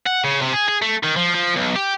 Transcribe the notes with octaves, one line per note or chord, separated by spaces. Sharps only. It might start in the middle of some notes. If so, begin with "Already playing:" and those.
F#5
C#3
C3
G#4
G#4
A3
D#3
F3
F3
B1
G4